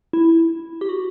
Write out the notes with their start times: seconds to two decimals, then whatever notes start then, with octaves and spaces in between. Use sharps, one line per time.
0.13 E4
0.81 G4
0.89 F#4